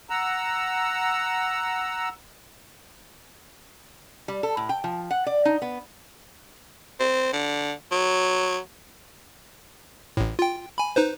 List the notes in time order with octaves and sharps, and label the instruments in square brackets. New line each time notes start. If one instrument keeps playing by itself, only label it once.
[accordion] F#5 A#5 E6
[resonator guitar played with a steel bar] G3
A4
A2
G5
F3
F#5
D5
D#4
B3
[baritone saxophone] C4
D3
F#3
[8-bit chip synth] A1 A2
F4 G5
G#5 B5
D#4 B4 C5